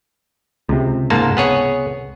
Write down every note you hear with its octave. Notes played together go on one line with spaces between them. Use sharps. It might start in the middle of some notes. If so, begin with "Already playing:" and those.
C#2 C3
G#2 A#3 A5
B3 G#4 C#5